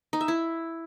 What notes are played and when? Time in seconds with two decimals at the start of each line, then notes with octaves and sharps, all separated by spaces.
0.13 D#4
0.21 E5
0.28 E4